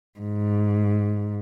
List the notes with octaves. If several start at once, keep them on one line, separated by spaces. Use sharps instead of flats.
G#2